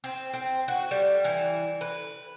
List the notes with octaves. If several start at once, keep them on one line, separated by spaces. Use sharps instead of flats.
C4
C4
F#4
G3
E3
B4